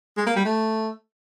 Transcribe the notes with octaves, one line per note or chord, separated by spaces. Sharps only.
G#3
A#3
G3
A3